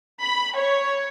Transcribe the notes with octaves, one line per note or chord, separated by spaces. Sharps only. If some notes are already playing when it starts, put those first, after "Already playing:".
B5
C#5